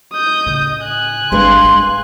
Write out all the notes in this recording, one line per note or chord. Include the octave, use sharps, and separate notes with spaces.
D#5 D#6 G6
A2 C#3
G#5 F#6
G#1 G2 G#3 A3 B4 F5 C6
A2